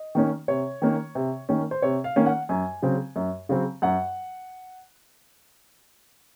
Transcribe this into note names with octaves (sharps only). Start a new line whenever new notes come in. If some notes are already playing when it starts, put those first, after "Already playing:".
Already playing: D#5
D#3 A#3 C#4
C3 C#5
D#3 A#3 C#4
C3
D#3 A#3 C#4
C5
C3 C#5
F5
D#3 A#3 C#4
F#5
F#2 G#5
C#3 F#3 C4
F#2
C#3 F#3 C4
F#2 F#5